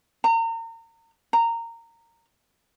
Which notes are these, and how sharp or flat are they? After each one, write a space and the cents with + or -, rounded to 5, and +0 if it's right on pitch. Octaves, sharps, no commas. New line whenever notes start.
A#5 -35
A#5 -15